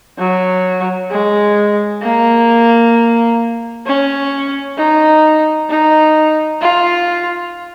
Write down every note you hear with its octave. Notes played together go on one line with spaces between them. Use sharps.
F#3
G#3
A#3
C#4
D#4
D#4
F4